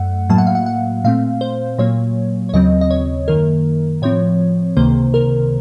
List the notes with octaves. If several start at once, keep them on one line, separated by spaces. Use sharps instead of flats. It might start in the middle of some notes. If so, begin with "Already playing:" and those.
Already playing: F#2 A3 F#5
A2 F#3 A#3 A5
F#5
F5
F#5
F#5
A#2 A3 C4 F5
C5
A#2 F#3 A#3 C#5
C#5
D#2 C#3 F#3 C4 D#5
D#5
C#5
F#2 D#3 A#3 A#4
A2 F3 C4 C#5
C#2 C3 D#3 A#3 C5
A#4